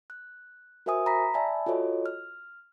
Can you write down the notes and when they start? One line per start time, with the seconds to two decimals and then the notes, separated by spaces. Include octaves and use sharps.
0.10 F#6
0.86 F#4 A#4 C5 E5 G#5 D#6
1.06 A#5 B5 A#6 B6
1.34 D5 E5 G#5 A5 B5
1.66 F4 F#4 A4 C#5 D#5
2.06 F6